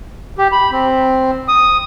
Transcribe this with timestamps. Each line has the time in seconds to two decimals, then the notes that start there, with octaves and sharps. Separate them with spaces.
0.38 G4
0.52 B5
0.71 C4
1.48 D#6